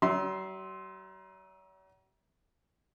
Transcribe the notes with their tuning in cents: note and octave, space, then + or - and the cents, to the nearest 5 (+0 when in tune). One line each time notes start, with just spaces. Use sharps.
F#3 +45 E5 -20 C6 +0